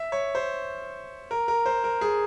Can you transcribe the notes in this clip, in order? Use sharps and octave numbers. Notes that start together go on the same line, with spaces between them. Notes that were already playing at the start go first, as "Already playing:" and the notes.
Already playing: E5
C#5
C5
A#4
A#4
C5
A#4
G#4